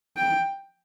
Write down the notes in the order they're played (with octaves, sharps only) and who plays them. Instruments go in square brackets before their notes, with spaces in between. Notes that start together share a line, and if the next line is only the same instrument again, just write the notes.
[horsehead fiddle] G5